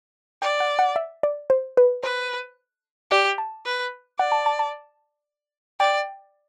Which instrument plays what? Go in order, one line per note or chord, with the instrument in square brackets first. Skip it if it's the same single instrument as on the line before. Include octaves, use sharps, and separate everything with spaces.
[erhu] D5 [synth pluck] G5
[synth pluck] F#5
F#5
E5
D5
C5
B4
[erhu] B4 [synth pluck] C5
[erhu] G4 [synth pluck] D5
[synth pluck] A5
[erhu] B4
[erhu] D5 [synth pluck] F#5
[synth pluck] A5
A5
A5
[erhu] D5 [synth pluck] G5